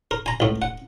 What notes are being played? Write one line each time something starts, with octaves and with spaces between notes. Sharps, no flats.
A#4
G#5 A#5
C#2 A2
F#5